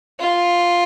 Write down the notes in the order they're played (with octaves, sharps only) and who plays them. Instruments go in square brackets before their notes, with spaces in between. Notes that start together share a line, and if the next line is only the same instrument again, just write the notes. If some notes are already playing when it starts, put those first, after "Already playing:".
[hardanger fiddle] F4